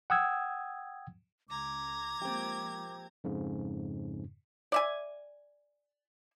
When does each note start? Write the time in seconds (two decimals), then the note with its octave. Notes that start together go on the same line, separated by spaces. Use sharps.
0.10 F#5 G5 D#6 E6 G#6
1.50 C#2 A#5 D6 G#6
2.22 F3 G#3 A#3 C4 G4
3.24 F2 G#2 C#3
4.72 D5 E5 G#5